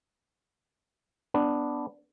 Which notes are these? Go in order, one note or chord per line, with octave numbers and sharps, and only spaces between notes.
B3 D4